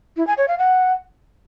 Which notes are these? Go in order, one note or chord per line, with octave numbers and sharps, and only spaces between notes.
E4
G#5
C#5
F5
F#5